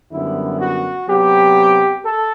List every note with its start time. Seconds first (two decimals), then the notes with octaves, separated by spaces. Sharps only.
0.11 F#2 D3 G3 B3 E4
0.60 F#4
1.08 C3 F#3 B3 G4
2.04 A4